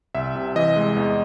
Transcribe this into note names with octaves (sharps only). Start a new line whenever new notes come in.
C2 E5
C3
E3 D#5
G#3
E2